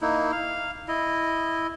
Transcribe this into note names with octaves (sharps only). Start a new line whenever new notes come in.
A#3 D#4 E4
F5
E4 D#5